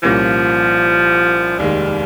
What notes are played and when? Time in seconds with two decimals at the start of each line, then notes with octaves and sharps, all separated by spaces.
0.03 C2 A#2 F3 G3 A#3 C#4
1.59 F1 D#2 D#3 G3 G#3